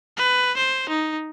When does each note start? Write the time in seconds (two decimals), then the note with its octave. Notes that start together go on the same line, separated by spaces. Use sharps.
0.17 B4
0.57 C5
0.89 D#4